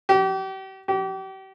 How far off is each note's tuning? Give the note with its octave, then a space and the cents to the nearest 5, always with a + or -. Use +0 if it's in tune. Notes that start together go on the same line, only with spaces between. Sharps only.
G4 -35
G4 -35